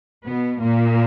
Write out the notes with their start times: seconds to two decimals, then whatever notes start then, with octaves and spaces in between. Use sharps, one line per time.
0.25 B2 B3
0.61 A#2 A#3